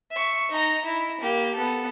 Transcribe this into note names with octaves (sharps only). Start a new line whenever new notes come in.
E5 C#6
D#4 A#5
E4
A#3 G4
B3 A4